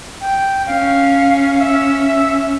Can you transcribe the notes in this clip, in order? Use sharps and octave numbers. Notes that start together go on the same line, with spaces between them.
G5
C#4 F5
F5
E5